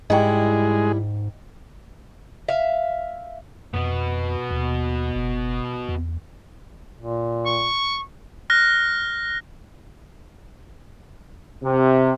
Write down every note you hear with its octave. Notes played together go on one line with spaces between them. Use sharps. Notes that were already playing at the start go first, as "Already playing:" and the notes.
G#2 G3 G#3 E4 D#5 G5
E5 F5
F2 B2 B3
D#2
F#1
E2
A#2
C#6
F6 F#6 A#6
C3